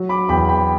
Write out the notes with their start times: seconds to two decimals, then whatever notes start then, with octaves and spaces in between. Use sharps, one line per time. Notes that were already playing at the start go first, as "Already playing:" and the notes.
Already playing: F#3
0.09 B5 D6
0.29 E2 G5 B5
0.49 G5 B5